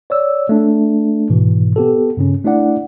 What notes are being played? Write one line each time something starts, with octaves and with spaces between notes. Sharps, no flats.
C#5 D5 E6
A3 D4
G#2 B2 E3
B3 G4 A4
G2 C#3 C#4
A3 D4 E4 D5 F#5